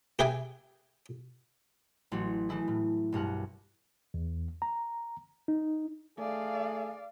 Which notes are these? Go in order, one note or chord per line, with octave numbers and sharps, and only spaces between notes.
G4 G#4 B4 E5 G5 G#5
A1 F#3 F#4
E3 A3 E4 G#4
A2
B1 G2 A#4 F#5
E2
A#5
D#4
A3 G#4 D5 F5